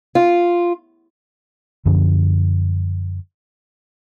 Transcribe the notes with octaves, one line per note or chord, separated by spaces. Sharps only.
F4
F#2 D3 F3 C#4